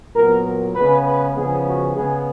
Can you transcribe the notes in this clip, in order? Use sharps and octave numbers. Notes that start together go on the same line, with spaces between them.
A#2 F#3 B3 A#4
A#4
C#3 G#3 B3 B4
B4
C#3 F3 G#3 B3 G#4
F#4
C#3 G#3 B3 G#4